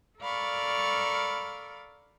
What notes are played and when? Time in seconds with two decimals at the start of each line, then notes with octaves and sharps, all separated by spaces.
0.20 A4 A#4 D5 F5 B5 C#6